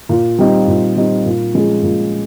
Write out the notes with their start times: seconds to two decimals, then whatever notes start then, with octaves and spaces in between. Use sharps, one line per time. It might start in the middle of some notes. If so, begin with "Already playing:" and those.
0.09 A#2
0.38 G3 C4 D#4
0.68 A#2
0.96 G3 C4 D#4
1.25 A#2
1.54 F3 G#3 C#4 G#4
1.83 A#2